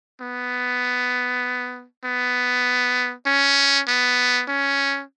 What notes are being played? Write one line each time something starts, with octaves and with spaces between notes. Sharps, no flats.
B3
B3
C#4
B3
C#4